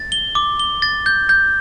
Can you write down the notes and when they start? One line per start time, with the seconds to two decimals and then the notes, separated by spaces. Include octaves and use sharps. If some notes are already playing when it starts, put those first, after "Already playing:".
Already playing: A6
0.12 G7
0.35 D6
0.60 G7
0.82 A6
1.06 G6
1.29 G6